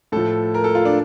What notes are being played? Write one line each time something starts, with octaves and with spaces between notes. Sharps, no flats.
A2 F3 A4
A#4
A4
F4
D4